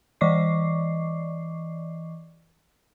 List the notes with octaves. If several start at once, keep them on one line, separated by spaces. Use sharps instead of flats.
E3 D5 D#5 C#6 D6 C7